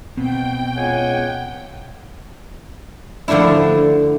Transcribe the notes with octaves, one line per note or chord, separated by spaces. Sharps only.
B2 C4 G5
C#2 F#5 G#5
D3 F3 A3 D4 E4